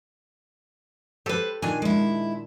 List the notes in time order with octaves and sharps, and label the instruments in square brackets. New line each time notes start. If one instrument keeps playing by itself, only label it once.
[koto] G4 A4 [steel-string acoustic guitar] B4 C5
[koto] A#2 D#3 D4 [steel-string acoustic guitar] G#5
[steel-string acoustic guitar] G#3 E4